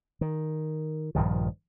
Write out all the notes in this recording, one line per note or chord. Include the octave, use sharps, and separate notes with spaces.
D#3
A#1 G2 D#3 F3